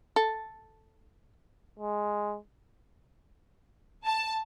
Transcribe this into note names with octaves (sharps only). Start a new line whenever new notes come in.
A4
G#3
A5